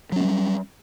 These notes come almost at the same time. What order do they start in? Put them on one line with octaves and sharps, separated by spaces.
F#3 C#4 A#3 G3